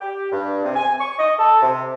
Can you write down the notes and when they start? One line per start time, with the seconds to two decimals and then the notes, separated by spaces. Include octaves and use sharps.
0.01 G4
0.32 G2
0.64 C3
0.76 G#5
1.00 C#6
1.19 D#5
1.39 A4
1.62 C3